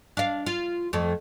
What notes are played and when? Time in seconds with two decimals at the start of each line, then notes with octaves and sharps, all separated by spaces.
0.17 D4 F5
0.46 F4
0.93 F2 A3